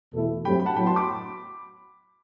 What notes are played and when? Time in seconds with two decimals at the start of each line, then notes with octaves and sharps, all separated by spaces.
0.14 E2 B2 A3 E4 A4
0.45 G2 F#3 A3 C4 G4 G5 B5
0.60 B5
0.66 F#5 A5
0.76 A2 F#3 B3 F#4 G5 B5
0.86 A5 C6
0.96 B5 D6